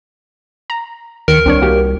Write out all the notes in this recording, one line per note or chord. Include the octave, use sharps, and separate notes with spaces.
A#5
D#2 D#3 A#4 C#7
C2 C4 D4 C#5
A#3 F#4 G4